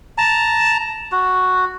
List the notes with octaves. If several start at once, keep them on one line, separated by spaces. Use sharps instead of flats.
A5 A#5
F#4